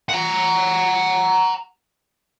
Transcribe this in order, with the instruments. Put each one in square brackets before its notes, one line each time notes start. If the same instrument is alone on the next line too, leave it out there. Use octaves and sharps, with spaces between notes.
[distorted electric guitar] F#5 A#5